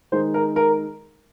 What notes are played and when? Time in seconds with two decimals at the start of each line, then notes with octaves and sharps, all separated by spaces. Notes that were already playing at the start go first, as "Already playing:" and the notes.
0.12 D#3 G#3 D#4 C5
0.34 A#4
0.56 A#4